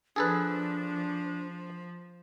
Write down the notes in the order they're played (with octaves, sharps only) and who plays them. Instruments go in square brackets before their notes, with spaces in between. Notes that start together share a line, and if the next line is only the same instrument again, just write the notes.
[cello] F3 [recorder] D4 [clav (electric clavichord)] G#4 A4 B4